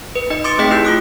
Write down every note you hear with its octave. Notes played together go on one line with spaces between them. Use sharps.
B4
D#4 D#5
C6 D6 D#6 A6 C#7 D7
A3 C4 G#4 D#5 G5 B6
E4 G4 E6 G6 D7
F4 D#6 F#6